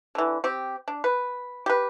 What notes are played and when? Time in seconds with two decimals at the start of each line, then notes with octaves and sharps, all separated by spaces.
0.15 D3 E3
0.44 C4 G4
0.88 D4
1.04 B4
1.66 G4 B4